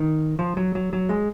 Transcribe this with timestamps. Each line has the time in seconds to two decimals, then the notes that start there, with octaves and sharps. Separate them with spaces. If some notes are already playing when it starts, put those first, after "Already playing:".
Already playing: D#3
0.39 F3
0.57 F#3
0.75 F#3
0.93 F#3
1.09 G#3